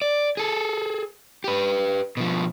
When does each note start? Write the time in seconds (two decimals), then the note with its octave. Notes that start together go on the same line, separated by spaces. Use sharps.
0.02 D5
0.37 G#4 A4
1.44 G4 B4
2.17 B2 F3